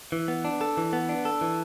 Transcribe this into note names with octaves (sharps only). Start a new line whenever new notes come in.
E3
B3
D4
A4
E3
B3
D4
A4
E3